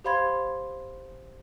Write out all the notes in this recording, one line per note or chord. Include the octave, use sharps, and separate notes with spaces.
G4 C5 F5 B5 C6 G#6